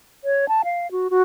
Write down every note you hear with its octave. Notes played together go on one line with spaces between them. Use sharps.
C#5
A5
F5
F#4
F#4